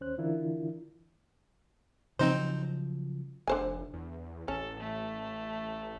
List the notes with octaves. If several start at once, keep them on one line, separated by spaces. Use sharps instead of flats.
D#2 C#4 C5 F#6
D3 E3 D4 E4 F4 A#4
C#3 F3 F#3 C4 D#4 C5
F1 D3 C5 G#5
E2
A1 C#4 A4
A3